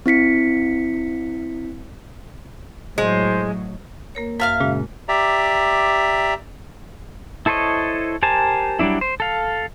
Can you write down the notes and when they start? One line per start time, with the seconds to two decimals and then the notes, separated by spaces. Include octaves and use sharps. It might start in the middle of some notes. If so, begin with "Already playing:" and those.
0.06 C4 E4 B6 C#7
2.98 A2 F#3 G#3 C5
4.15 A#3 A#4 C#5
4.40 F#2 E5 F5 F6
4.60 A#2 C#3 G#3 F#4
5.09 G4 D5 E5 A#5
7.46 E4 A4 C5 C#5 D#5
8.23 G4 A#4 C5 G#5 A5
8.79 F#3 G3 A#3 D4 E4
9.01 C5
9.20 A4 F5